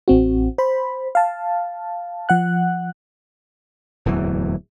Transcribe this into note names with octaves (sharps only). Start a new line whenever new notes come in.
A1 C4 F#4
C5 B5
F5 A5
F3 F#5 F#6
D1 E2 E3 F#3